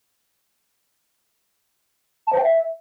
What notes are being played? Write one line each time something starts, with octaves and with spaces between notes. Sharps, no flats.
A5
C5
G5
E5